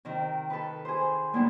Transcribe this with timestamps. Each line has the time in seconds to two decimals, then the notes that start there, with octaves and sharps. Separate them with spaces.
0.05 C3 D#3
0.50 A4 B4
0.85 G#4 C5
1.33 A2 A#3 B3 D4 D#4